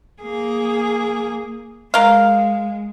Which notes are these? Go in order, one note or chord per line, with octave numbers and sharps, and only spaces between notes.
A#3 G#4
G#3 A#4 F5